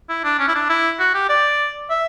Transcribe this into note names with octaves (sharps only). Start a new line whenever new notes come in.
E4
D4
C#4
E4
D4
E4
F#4
G4
D5
E5